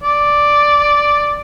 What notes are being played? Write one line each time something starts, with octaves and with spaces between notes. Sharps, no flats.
D5